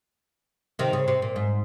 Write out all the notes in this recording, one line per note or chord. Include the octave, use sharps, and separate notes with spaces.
C3 D#3
C#3
C3
A#2
G#2